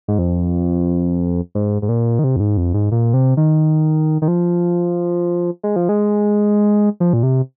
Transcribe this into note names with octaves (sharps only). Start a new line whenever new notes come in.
G#2
F2
G#2
G#2
A#2
D#3
C3
F2
G#2
F2
G#2
A#2
C3
D#3
D#3
F3
G#3
F3
G#3
F3
A#2
C3